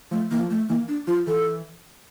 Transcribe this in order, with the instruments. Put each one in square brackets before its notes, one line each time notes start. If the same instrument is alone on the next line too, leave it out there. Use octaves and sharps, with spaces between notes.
[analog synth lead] F3 [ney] A3
[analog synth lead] E3 [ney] A#3
[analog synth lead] F3
[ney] A3
[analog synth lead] E3 [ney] A#3
[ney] D4
[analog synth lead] F3 [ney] F4
[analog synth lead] E3 [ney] A4